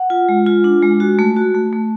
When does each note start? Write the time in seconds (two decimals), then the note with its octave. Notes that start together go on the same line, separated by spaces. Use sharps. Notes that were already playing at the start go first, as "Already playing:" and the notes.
Already playing: F#5
0.10 F4
0.29 G#3
0.47 F4
0.64 D4
0.83 G#3
1.00 F#4
1.19 A3
1.36 F#4
1.55 A3
1.73 A3